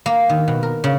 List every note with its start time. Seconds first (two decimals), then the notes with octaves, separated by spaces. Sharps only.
0.06 A#3
0.29 D#3
0.48 B2
0.63 A#4
0.84 C#3